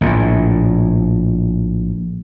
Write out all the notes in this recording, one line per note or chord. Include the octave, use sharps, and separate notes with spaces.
A#1 A2